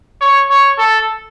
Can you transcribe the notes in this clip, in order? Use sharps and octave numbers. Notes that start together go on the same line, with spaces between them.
C#5
C#5
A4